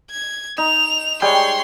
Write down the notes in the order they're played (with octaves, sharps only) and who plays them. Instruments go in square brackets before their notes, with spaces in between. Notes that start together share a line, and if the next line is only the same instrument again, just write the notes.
[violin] G#6
[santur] D#4 [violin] F7
[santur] G3 G#3 G5 [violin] C#5 C6